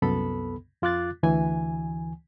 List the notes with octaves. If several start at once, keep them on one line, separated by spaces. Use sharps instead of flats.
C2 F#2 B3 A4 B5
F2 F4 D6 F#6 A6
D2 E3 G#5